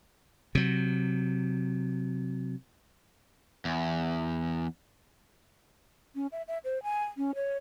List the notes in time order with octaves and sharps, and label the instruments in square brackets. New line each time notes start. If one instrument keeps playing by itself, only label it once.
[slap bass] C3 F#3
[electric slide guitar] E2
[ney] C#4
E5
E5
C5
G#5
C#4
C#5